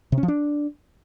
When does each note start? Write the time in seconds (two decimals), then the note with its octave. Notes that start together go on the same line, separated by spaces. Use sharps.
0.12 C3
0.18 C#4
0.23 F3
0.28 D4